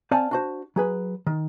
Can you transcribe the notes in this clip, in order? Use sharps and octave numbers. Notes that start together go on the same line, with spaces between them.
C4 C5 D5 F5 G#5 A5
D4 F#4 C5
F#3 G#4 B4
D#3